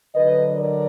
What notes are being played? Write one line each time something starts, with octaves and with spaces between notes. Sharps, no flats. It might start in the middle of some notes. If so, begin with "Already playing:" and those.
D3 F#3 B4 D#5
A#4 D5